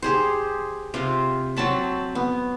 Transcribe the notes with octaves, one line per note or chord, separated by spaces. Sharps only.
G4 G#4 C5
C3 F4 C5
F#3 C4 A5 B5
B3